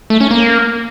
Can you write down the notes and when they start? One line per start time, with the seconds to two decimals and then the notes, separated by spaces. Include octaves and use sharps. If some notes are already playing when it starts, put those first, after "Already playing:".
0.10 A3
0.20 C#4
0.31 A#3